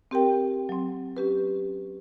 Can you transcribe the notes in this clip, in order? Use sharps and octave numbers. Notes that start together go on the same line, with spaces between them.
C4 G4 A#4 G5
F#3 C4
C#4 G4 B4